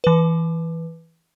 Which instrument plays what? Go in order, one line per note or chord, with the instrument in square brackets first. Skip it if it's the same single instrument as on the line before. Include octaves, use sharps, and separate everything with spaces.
[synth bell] E3 B4